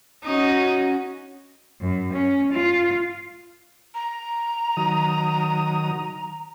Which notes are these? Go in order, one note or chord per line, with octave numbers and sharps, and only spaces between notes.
C#4 D#4 F#4 D#5
F#2
C#4
F4
A#5
D#3 F#3 D#6